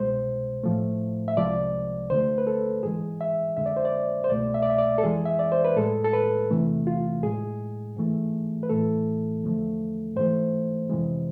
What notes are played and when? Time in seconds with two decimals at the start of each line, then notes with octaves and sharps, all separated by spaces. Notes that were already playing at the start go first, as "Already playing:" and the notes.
Already playing: C2 B2 G#3 C5
0.64 A2 F3 A3
1.28 E5
1.37 C2 C3 F3 G#3 D5
2.10 D2 D3 A3 C5
2.38 B4
2.47 A4
2.83 G#2 E3 G#3 G#4
3.21 E5
3.57 F2 D3 G#3 E5
3.66 D5
3.76 C5
3.85 D5
4.24 C5
4.30 C2 B2 A3 D5
4.54 E5
4.63 D5
4.70 E5
4.78 D5
4.98 A4
5.03 F2 E3 G#3 G#4
5.25 E5
5.39 D5
5.52 C5
5.65 B4
5.76 A2 G#3 A4
6.04 A4
6.13 B4
6.50 E2 C3 E3 A3
6.87 F4
7.23 A2 G#3 G#4
7.97 G#2 E3 A3
8.63 B4
8.69 A2 E3 A3 A4
9.44 E2 D3 F3 A3
10.16 G#2 E3 A3 C5
10.90 F2 C3 E3 G#3